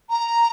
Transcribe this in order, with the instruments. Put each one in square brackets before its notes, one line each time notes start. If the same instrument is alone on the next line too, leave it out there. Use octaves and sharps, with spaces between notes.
[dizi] A#5